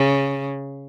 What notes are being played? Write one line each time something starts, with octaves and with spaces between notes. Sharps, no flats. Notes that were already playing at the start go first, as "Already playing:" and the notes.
Already playing: C#3